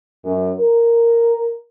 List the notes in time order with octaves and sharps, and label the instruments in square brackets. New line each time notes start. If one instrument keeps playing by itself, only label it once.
[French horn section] F#2
A#4